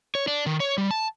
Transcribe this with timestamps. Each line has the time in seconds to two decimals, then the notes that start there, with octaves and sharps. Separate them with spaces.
0.15 C#5
0.28 D4
0.46 D#3
0.60 C#5
0.78 G3
0.91 A5